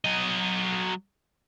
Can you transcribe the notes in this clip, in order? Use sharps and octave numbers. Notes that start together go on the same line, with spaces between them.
F#3 D#5